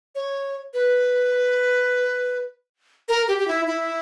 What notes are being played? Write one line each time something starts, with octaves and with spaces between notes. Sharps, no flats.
C#5
B4
A#4
G4
G4
E4
E4